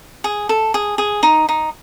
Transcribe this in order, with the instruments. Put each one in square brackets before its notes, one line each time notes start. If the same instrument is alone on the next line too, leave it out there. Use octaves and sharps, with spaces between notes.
[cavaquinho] G#4
A4
G#4
G#4
D#4
D#4